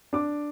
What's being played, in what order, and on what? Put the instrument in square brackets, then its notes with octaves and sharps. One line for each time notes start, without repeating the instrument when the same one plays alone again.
[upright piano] D4 D6